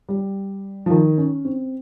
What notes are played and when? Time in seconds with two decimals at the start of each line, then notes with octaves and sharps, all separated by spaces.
0.09 G3
0.86 F3
0.90 D#3
1.18 C#4
1.45 C4